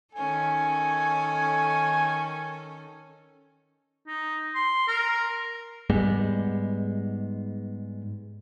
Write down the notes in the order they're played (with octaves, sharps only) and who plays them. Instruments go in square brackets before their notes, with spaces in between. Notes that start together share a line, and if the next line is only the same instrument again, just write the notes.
[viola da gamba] D#3 C#4 A4 [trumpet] G#5
[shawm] D#4
C6
A#4
[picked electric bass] G#2 G3 G#3 B3